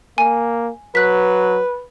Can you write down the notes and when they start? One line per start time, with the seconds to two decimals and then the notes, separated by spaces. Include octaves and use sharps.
0.18 A#3 G#5
0.95 F#3 B4 F#6 B6